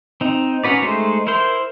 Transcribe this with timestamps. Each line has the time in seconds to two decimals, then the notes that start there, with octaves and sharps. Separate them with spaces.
0.21 C4 D#4
0.64 C#4 D#4 F#4 B4 D5
0.82 G#3 A3 D#4 C5
1.27 E4 A#4 C5 C6